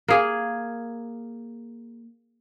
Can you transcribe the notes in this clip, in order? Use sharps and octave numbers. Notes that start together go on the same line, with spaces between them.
A#3 G#4